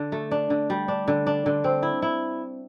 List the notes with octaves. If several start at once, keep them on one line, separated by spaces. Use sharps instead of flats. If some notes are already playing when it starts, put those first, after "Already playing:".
Already playing: D3 D4
A3
D4
D3
G3
D4
D3
D4
D3
C4
E4
E4